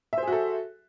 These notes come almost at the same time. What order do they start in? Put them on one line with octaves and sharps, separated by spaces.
E5 C5 G#4 F#4 A4